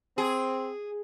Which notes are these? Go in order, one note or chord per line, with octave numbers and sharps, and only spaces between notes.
C4 G#4